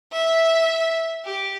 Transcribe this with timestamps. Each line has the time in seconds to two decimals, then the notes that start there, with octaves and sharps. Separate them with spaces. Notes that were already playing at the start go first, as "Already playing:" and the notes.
0.12 E5
1.25 G4